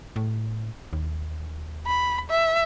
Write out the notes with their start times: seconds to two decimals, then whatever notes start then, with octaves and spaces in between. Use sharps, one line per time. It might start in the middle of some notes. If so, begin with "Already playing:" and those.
0.16 A2
0.93 D#2
1.86 B5
2.30 E5